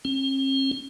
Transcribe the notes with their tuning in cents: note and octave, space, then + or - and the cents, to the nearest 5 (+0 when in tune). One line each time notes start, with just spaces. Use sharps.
C4 +45